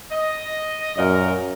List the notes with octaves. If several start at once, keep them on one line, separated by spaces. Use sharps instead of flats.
D#5
F#2 A#2 A#4